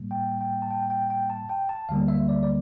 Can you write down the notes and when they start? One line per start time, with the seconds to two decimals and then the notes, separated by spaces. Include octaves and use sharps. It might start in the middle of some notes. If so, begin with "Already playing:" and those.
Already playing: A2 G3 A#3
0.11 G5
0.41 G5
0.62 A5
0.70 G5
0.90 G5
1.10 G5
1.30 A5
1.49 G5
1.69 A5
1.89 D2 D3 G3 A#3 F5
2.08 E5
2.29 D5
2.43 D5